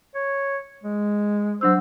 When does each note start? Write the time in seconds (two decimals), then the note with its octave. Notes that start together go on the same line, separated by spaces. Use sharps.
0.15 C#5
0.83 G#3
1.61 F#3 D4 C5 E6